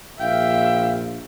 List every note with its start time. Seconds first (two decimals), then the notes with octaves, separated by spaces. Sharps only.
0.20 A#1 E5 F5 G5